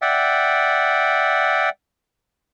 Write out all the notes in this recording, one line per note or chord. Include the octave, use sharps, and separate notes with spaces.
D5 E5 F#5 G5